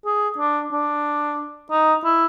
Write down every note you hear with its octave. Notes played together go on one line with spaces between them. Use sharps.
G#4
D4
D4
D#4
E4